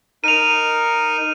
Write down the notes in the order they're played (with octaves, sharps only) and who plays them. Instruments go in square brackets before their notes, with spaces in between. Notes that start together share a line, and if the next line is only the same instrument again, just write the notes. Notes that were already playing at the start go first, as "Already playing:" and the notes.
[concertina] D#4 A#4 [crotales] D#7 F7